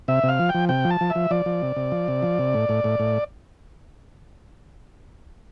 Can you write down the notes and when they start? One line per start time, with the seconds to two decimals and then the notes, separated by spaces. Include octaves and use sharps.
0.08 C3 E5
0.23 C3
0.28 F5
0.39 F3
0.49 G5
0.54 F3
0.69 C3 G5
0.85 F3
0.91 A5
1.01 F3
1.10 E5
1.15 F3
1.31 F3 D5
1.46 F3
1.62 C3
1.76 C3
1.92 F3
2.08 C3
2.22 F3
2.39 C3
2.54 A2
2.69 A2
2.84 A2
3.00 A2